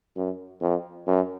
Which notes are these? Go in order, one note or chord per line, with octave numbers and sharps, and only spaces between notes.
F#2
F2
F#2